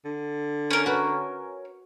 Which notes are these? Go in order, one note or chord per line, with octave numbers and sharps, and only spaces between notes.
D3
C#4 A#4
F#4 B4